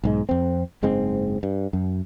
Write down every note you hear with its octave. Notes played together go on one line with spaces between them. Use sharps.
B1 G#2 G#3
F2 C4
F#1 G#2 G#3 C4
G2
F#2